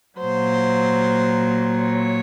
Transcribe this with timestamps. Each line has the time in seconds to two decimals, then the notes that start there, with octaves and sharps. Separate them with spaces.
0.19 A#2 F#3 C5
1.79 C#5